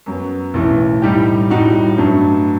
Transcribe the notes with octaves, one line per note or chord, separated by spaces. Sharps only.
F#2 F#3 B3
B1 A2 E3 A3
A2 G3 D#4 G4
A2 G3 D#4 F#4
G2 F#3 A3